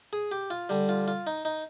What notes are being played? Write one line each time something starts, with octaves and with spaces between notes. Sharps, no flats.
G#4
G4
F4
D3 G3
F4
F4
D#4
D#4